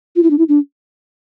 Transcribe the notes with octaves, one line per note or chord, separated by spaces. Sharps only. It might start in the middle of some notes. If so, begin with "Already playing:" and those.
F4
E4
D4
E4
D4